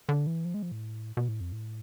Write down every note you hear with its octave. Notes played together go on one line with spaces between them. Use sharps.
D3
E3
F3
G#3
F3
A2
B2
A2
F2
A2